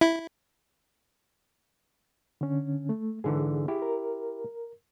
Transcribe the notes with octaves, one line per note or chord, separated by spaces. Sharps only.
E4
D3 C#4
A3
G#2 D3 E3 G#4
E4 G4
A#4